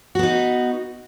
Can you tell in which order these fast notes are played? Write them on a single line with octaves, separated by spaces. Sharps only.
F#4 B3 D#4